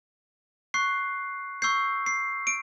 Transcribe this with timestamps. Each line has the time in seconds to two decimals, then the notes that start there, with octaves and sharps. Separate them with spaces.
0.74 C#6 F#6 C7
1.62 C#6 E6 G6 C7
2.06 C7
2.47 D7